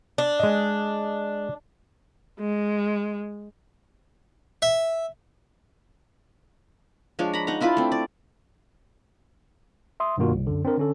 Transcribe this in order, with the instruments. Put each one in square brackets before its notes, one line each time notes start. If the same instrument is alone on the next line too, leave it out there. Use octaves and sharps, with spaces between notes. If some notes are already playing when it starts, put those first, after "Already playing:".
[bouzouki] D4
[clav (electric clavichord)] G#3 D#5
[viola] G#3
[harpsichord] E5
[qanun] F3 G#3 D4 C#5
A#5 B5
D#4 F#5 A#5
D4 E4 F4 B4
A3 C4
D5
[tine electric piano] E5 C6 D#6
G2 B2 D#3 A#3 F4 F#4
C2
F#2 D3
C4 D4 A#4
D3 C#4 A4